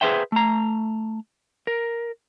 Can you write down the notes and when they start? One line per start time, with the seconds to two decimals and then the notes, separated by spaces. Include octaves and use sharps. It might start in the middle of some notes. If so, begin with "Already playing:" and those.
0.01 G#4 A4 B4 C5 E5 G5
0.32 A3 A#5
1.67 A#4